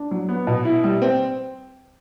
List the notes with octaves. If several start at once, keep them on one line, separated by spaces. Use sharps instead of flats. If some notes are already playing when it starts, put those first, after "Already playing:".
Already playing: D4
F#3
B3
B2
E4
G3
C4